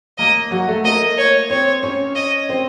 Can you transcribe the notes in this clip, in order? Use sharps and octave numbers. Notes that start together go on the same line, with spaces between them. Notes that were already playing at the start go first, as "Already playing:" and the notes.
A#3 A#4 D#5
F#3 F#4
A3 A4
A#3 A#4 D#5
C#5
C4 C5 C#5
C#4 C#5
D#5
C4 C5